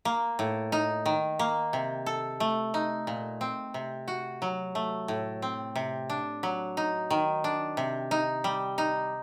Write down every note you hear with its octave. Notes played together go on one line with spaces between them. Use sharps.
A#3
A2
D#4
D#3
A#3
C3
A4
A3
D#4
A#2
C4
C3
F#4
F#3
A3
A2
C4
C3
D4
F#3
D#4
D#3
D4
C3
D#4
G3
D#4